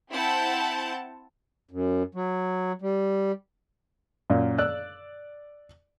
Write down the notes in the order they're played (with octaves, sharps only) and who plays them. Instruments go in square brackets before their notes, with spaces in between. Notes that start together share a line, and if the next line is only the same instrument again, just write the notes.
[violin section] C4 E4 F#5 A5 G6
[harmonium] F#2
F#3
G3
[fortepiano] F#2 A#2
D5 E6 F#6